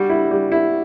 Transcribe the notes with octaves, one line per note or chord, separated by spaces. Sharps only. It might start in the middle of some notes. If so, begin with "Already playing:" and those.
Already playing: G3 D4 F#4
E4
G3
E4